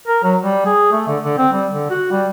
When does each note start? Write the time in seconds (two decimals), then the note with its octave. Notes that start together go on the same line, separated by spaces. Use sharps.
0.07 A#4
0.24 F#3
0.44 G3
0.66 G#4
0.92 A3
1.08 D3
1.23 D3
1.38 C4
1.53 G3
1.72 D3
1.90 F#4
2.11 G3